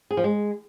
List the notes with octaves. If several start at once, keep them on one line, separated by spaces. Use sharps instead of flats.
G#4
F3
G#3